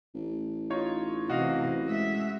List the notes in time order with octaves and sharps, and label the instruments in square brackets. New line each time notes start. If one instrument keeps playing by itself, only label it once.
[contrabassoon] A1
[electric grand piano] D#4 F4 C#5
[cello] C3 E3 [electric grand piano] F#4 D#5 F5
[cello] G#3 E5